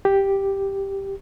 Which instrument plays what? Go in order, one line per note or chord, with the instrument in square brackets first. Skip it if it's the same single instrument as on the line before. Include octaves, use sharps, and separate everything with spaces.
[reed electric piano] G4